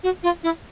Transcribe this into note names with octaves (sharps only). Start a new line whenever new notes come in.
F#4
F4
E4